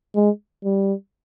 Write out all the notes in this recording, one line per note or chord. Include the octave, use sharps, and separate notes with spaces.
G#3
G3